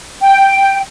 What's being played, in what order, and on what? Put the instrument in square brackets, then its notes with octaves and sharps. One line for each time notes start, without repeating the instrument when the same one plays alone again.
[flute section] G5